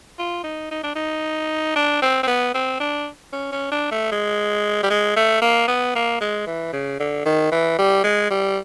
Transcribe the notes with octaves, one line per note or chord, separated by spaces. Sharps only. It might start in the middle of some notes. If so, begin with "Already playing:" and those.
F4
D#4
D#4
D4
D#4
D4
C4
C4
B3
C4
D4
C#4
C#4
D4
A3
G#3
G3
G#3
A3
A#3
B3
A#3
G#3
E3
C#3
D3
D#3
E3
G3
G#3
G3